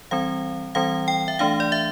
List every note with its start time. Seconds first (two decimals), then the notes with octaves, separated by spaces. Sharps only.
0.11 E3 G3 C4 F5
0.75 E3 G3 C4 F5
1.08 G5
1.28 E5
1.39 E3 A3 D4 F5
1.60 D5
1.72 E5